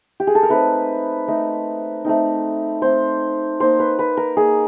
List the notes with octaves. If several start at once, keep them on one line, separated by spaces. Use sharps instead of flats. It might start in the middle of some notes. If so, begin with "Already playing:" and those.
G4
G#4
A4
A#4
A3 C4 D#4 B4
A3 C4 D#4
A3 C4 D#4
A3 C4 D#4 C5
A#3 D#4 C5
B4
B4
A#4
A#3 D#4 G#4